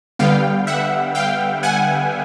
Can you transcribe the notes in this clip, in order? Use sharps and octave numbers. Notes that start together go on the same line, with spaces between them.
D3 G3 B3 F5 G5
E5 F#5
F5 G5
F#5 G#5